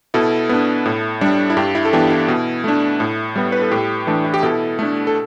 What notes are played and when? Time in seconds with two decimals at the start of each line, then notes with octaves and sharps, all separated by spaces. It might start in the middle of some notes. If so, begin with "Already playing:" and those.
0.14 B2 E4 A4
0.49 B3 D4
0.86 A2
1.21 G3 D4
1.50 E4
1.57 G2 G4
1.75 E4
1.85 A4
1.93 E3 B3 D4 G4
2.10 E4
2.28 B2
2.64 A3 D4
3.00 A2
3.36 G3 B3
3.52 B4
3.62 A4
3.71 A2 G4
4.07 E3 A3 D4
4.24 E4
4.34 G4
4.43 B2 E4 A4
4.79 A3 D4
5.07 A4